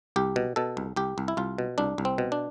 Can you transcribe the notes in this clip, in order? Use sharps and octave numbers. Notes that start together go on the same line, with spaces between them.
C2 G4
B2
B2 A4
C2
C2 G4
C2
E4
C2 F4
B2
C2 D4
C2
C4
B2
D4